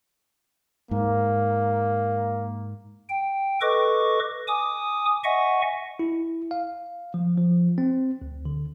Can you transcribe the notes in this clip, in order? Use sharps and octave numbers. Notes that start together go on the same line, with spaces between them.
G#2 A#3
G5
A4 B4 D#5 C#6 D6
G#5 D6 D#6
D#5 E5 F#5 G#5 C#6
E4
F5
F3
F3
C4
D2
D3